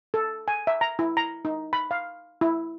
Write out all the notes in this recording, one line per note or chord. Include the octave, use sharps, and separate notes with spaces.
A4
G#5
E5
A#5
E4
A#5
D#4
B5
F5
E4